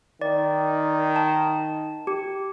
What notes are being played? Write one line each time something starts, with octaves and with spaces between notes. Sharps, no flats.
D#3 D5
A5
G4